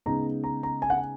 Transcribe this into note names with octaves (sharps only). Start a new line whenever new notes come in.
C#3 G#3 B3 D#4 A#5
A#5
A#5
G#5
F#5
G#5